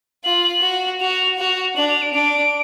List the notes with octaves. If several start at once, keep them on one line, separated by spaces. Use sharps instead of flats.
F4 F#7
F#4
F#4 F7
F#4
D4 F#7
F7
D7
D4 D7